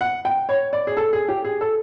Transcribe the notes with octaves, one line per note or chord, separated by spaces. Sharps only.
F#5
G5
C#5
D5
G#4
A4
G#4
G4
G#4
A4